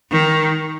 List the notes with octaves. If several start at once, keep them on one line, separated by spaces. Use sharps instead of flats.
D#3